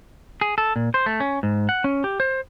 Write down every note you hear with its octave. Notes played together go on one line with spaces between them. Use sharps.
G#4
A4
A#2
C5
A3
C#4
G#2
F#5
C#4
G4
C5